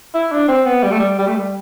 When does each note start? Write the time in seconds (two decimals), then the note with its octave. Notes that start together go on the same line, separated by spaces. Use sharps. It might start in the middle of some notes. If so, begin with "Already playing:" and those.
0.14 E4
0.32 D4
0.49 C4
0.66 B3
0.83 G3
0.91 A3
0.99 G3
1.19 G3
1.27 A3
1.35 G3